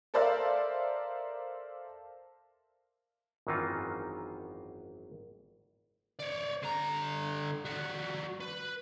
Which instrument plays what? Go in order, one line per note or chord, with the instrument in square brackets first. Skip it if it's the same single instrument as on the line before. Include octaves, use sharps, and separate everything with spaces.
[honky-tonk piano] A4 A#4 C5 D5 E5 F5
[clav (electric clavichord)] G#1 F#2 D#3 E3 D#4 F4
[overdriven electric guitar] C#5 D5
D3 A#5
G3 F#4
B4